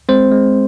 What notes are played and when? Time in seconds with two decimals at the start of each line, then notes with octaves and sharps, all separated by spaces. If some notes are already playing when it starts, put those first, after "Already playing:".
0.09 G#3 C4 C5
0.32 G#3